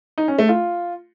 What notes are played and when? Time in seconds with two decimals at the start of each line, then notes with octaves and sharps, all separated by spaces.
0.18 D#4
0.28 C#4
0.38 A3
0.49 F4